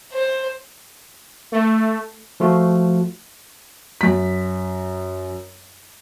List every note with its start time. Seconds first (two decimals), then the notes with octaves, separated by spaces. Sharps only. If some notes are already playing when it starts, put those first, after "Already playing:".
0.13 C5
1.52 A3
2.40 F3 A3 F4 F#4
4.01 F#2 B6